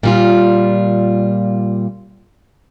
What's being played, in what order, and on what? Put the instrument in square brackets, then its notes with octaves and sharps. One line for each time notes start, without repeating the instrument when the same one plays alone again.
[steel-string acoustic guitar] A#2 G3 F4